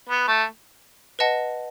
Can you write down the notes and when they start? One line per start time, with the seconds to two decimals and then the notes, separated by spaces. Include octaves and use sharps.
0.09 B3
0.27 A3
1.19 B4 D#5 F#5 A5